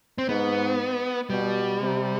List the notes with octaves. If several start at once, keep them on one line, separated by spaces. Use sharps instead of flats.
C4
G#2 B3
B2 G3
C3